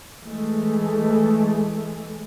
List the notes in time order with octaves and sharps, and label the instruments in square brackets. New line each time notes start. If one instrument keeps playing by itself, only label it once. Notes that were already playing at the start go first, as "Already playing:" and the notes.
[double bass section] E3 G#3 A3